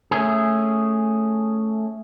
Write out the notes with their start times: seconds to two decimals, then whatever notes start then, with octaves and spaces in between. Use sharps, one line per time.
0.11 A3 C#4 G#4